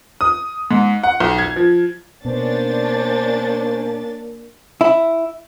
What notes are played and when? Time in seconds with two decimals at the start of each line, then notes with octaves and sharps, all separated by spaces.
0.21 D#6
0.71 G#2
1.03 F#5
1.20 B1
1.39 G#6
1.56 F3
2.25 B2 A#3 B3 C#4 D4 C5 A6
4.81 E4